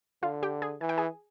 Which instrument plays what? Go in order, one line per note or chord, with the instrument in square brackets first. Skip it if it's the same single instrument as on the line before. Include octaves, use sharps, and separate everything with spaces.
[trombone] D3 [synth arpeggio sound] F4 F5
[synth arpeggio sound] G4 G5
G#4 G#5
[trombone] E3 [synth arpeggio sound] G#5
[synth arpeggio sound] G5
G#4 G#5